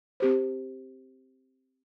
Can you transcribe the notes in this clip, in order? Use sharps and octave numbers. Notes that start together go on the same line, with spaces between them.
C4 G4 C5